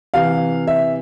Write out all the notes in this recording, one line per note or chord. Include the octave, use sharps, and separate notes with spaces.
C3 E3 F5
E5